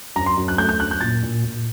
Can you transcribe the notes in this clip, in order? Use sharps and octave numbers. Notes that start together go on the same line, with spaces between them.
F#2 A#5
C6
F#2
F#6
A3 G6
G6
F#2 F#6
G6
A#2 A6
A#2
A#2